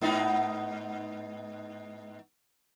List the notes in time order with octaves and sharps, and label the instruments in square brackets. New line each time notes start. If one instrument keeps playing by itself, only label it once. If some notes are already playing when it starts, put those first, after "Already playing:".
[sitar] G#2 B3 D#4